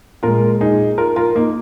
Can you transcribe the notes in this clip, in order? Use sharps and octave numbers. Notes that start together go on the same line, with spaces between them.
A#2 G#3 F4 A#4
D#4 G#4
F4 A#4
F4 A#4
A#3 D#4